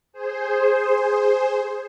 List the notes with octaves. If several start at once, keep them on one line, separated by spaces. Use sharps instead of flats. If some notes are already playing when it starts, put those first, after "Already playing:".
G#4 C5